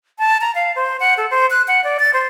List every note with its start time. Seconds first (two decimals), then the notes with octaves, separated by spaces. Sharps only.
0.19 A5
0.41 A#5
0.55 F5
0.76 C5
1.00 F#5
1.17 A4
1.31 C5
1.50 F#6
1.68 F#5
1.84 D5
2.00 A6
2.14 C5